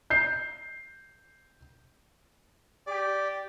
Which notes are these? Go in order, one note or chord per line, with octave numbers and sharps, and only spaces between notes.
G6 C7
G4 D5